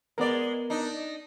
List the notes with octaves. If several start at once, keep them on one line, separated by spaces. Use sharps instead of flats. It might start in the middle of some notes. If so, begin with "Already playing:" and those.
G#3 B3 A#4 D5
D4 D#4